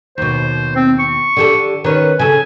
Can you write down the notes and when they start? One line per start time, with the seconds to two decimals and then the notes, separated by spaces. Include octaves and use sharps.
0.18 D#2 B2 C5
0.76 C4
0.99 C#6
1.37 D3 G4 A4
1.84 D#3 C#4 B4 C#5
2.19 C#3 A4 G#5